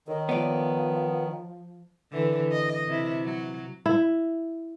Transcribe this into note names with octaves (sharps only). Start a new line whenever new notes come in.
D#3 A#4 C#5 D#5
F3 B3 C#5 D5
D3 E3
D#5
C3 E4
F#3
E4